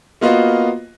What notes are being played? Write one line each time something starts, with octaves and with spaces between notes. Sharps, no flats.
A#3 B3 F4 F#4 D#5 F5